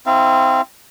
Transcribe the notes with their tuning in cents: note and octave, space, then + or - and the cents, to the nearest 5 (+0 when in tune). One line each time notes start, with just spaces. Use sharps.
C4 +0 E4 -35 F5 -35